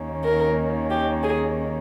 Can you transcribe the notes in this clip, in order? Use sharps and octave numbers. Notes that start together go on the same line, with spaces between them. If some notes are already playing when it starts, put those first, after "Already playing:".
Already playing: D#2 D#3 A#3 C#4
A#4
G4
G#4